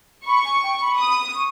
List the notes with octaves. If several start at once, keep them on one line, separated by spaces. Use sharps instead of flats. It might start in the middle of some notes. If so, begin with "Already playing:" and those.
B5 C#6
G#5
G5
B5
D#6
C#6